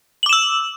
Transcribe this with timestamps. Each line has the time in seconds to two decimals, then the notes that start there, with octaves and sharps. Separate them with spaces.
0.23 F#7
0.26 D6
0.29 E7
0.33 E6